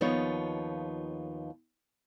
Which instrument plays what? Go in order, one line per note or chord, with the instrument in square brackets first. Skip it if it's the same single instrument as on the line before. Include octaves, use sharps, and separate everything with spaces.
[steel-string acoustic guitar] D#2 F3 B3 D#4 F4 C#5